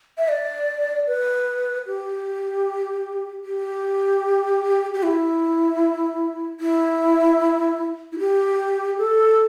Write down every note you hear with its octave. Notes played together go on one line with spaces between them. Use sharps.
E5
D5
B4
G4
G4
G4
E4
E4
E4
G4
A4